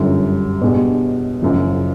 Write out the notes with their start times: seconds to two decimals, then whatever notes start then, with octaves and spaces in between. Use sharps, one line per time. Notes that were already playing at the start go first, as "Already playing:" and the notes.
Already playing: G1 F#2 D3 G3
0.62 B2 G#3 B3 D4 G4
1.42 F#1 F#2 C#3 F3